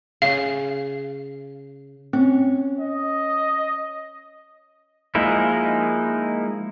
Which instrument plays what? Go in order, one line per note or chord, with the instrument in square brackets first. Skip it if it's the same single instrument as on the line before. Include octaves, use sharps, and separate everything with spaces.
[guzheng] C#3 [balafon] F5
[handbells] C4 [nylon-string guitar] C#4
[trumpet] D#5
[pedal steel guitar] F3 G#3 A#3 D#4 E4